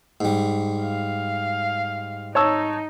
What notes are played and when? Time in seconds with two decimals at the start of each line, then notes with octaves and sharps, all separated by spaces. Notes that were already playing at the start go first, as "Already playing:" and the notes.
0.21 G#2 G3
0.83 F5
2.35 D#4 C#5 A5 E6